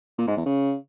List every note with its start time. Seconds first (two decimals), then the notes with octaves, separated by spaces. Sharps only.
0.18 A#2
0.27 G#2
0.37 E2
0.46 C#3